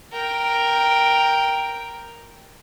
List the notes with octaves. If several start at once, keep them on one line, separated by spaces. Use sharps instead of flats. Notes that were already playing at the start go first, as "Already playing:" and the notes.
A#4 G5